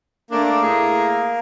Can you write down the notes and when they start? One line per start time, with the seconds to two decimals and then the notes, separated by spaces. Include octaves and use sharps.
0.31 A3 A#3 D4
0.63 A2 A3 G#4